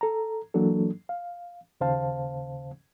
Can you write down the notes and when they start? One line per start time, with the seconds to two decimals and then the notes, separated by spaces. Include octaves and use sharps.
0.01 A4 A#5
0.54 E3 F#3 A#3 D4 A4
1.09 F5
1.81 D#2 C#3 C5 F5 A5